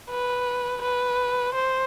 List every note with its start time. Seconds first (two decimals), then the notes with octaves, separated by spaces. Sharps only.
0.10 B4
0.82 B4
1.55 C5